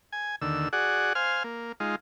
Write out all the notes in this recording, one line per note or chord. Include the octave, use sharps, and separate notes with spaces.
G#5
D#2 D3 E6
F#4 G#4 D5 F#5
C5 F5 G#5 F6
A#3
G#3 D#4 F4